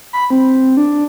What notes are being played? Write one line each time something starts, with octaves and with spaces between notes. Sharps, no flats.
B5
C4
D4